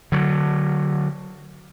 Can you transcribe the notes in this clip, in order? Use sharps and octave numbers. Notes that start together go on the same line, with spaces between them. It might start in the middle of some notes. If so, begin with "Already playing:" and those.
D3 F#3